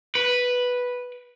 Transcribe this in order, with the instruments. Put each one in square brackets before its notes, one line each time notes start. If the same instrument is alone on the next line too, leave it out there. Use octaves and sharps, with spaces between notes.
[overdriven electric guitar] B4